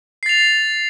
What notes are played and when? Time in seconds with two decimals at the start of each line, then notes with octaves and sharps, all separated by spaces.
0.23 C7
0.26 A6
0.29 F7